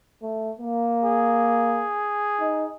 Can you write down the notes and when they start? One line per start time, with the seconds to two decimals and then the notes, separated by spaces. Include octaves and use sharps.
0.22 A3
0.59 A#3
1.04 G#4
2.41 D#4